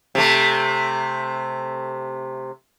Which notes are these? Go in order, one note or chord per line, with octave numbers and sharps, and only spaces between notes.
C3 A3